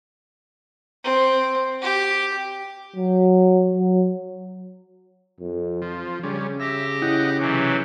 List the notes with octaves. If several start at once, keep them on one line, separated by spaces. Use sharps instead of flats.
C4
G4
F#3
F#3
F2
F3
C#3 G3 C#4
G4 E5 A#6
E4 D#5 F#5 G5
C3 E3 F#3 C#4